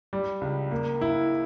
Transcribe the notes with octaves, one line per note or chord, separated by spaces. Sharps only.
G3
C#2
A#3
E4